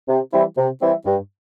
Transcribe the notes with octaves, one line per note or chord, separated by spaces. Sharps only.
C3
E3 G3 C4 E4
C3
E3 G3 C4 E4
G2